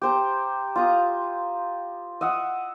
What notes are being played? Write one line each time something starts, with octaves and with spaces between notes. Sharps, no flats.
G4 C5 A#5
F4 A#5 D#6
D#5 E5 F#5 D#6